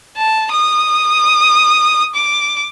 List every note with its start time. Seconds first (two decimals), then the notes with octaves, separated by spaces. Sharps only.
0.17 A5
0.51 D#6
2.15 D6